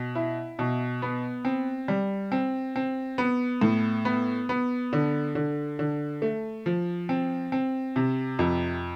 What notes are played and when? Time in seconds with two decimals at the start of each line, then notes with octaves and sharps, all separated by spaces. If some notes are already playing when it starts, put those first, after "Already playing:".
Already playing: B2
0.15 E4
0.59 B2
1.02 B3
1.45 C4
1.88 G3
2.32 C4
2.76 C4
3.18 B3
3.61 A2
4.05 B3
4.49 B3
4.93 D3
5.35 D3
5.79 D3
6.22 A3
6.66 F3
7.09 C4
7.52 C4
7.96 C3
8.39 F2